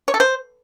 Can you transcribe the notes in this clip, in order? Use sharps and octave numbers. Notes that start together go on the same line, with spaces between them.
C#5
A4
C5